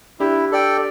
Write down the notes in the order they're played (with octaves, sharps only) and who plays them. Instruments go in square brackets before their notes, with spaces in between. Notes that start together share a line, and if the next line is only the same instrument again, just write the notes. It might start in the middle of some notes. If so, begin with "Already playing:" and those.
[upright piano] D4 G4 [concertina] E4
[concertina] A4 D5 G5